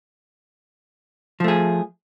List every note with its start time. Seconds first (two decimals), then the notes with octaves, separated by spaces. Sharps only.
1.40 F3
1.44 A3
1.48 G#4